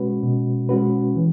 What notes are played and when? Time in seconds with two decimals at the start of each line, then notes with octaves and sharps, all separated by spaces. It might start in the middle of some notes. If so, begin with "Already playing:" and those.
Already playing: B2 G#3 C#4 F#4 B4
0.23 B2
0.69 G#3 C#4 F#4 B4
1.16 E3